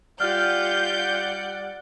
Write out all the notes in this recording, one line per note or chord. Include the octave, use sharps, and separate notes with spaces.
G3 F4 G4 D5 F#5 F6 G6